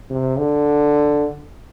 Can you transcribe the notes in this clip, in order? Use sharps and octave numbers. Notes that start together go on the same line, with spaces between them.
C3
D3